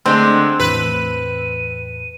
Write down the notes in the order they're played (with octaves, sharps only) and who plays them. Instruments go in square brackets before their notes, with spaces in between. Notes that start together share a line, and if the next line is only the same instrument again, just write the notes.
[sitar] D3 G#3 [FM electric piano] A3 D4 [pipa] C4 [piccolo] F#6
[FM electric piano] E2 A2 E3 [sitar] B4 [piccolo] D#7